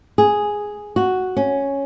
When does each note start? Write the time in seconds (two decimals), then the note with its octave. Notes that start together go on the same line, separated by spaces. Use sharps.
0.18 G#4
0.96 F#4
1.37 C#4